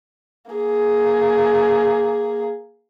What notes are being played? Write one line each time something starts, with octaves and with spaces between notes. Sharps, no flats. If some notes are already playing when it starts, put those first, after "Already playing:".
A#3 G#4